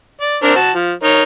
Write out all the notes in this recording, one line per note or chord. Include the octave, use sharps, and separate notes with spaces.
D5
C4 D4 A#4
F#4 A5
F3
D#4 A#4 C#5